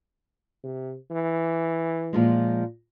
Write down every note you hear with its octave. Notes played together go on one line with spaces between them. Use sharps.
C3
E3
A#2 F3 G#3